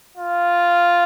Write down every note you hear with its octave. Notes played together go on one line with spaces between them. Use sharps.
F4